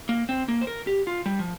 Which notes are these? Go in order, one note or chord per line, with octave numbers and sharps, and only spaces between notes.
A#3
C4
A#3
C5
A#4
G4
F4
G3
F3